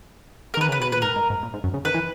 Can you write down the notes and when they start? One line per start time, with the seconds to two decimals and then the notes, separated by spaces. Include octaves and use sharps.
0.54 A#4
0.57 D#3 B4
0.68 C#3 B4
0.80 B2 B4
0.91 A#2 B4
1.02 G#2 A#4
1.16 G#2
1.30 G#2
1.43 A#2
1.54 G#2
1.64 F#2
1.74 C#3
1.85 D#3 B4
1.94 E3